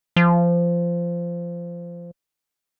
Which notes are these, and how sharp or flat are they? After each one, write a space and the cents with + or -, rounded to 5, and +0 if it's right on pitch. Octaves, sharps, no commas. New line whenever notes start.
F3 -15